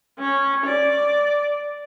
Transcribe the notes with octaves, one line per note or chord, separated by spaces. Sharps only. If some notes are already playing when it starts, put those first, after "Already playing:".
C#4
D5